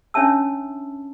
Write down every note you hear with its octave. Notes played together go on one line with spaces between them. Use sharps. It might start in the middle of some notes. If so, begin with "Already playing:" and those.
C#4 D4 C#5 E5 A5 E6